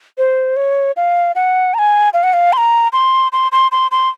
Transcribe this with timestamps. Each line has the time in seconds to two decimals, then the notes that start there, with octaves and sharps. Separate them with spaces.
0.18 C5
0.56 C#5
0.97 F5
1.35 F#5
1.74 A#5
1.79 G#5
2.14 F5
2.23 F#5
2.33 F5
2.53 C6
2.57 A#5
2.93 C6
3.32 C6
3.52 C6
3.72 C6
3.91 C6